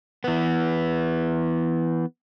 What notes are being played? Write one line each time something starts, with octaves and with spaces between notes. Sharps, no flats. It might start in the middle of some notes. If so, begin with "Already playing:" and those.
E3 B3